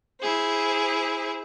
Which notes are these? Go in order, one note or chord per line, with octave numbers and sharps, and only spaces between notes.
E4 G#4 C5